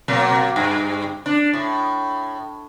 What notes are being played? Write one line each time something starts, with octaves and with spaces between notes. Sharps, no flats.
B2 F#3 A#3
G2
D4
A2